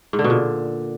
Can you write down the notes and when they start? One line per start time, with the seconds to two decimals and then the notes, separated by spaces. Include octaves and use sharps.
0.13 G#2
0.19 D3
0.24 B2
0.30 A#2